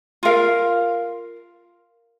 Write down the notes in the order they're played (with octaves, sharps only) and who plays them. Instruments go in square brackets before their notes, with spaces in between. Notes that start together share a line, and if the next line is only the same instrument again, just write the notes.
[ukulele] F4 A#4 F5